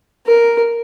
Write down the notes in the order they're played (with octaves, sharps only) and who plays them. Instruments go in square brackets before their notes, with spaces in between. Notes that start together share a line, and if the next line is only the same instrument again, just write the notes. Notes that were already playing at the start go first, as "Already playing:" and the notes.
[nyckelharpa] A#4